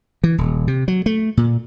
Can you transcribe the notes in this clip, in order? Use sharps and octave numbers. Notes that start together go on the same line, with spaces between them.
E3
D#1
C3
F#3
A3
A#2